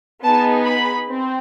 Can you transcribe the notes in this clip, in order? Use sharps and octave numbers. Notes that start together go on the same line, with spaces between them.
B3 D#4 G#4 A5
B5
C4